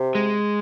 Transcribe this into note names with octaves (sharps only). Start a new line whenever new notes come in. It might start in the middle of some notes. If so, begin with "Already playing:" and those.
Already playing: C3
G#3